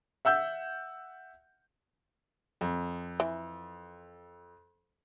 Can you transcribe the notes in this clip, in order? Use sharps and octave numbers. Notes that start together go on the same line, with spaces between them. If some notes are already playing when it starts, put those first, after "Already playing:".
E5 F#5 E6 G6
F2
E3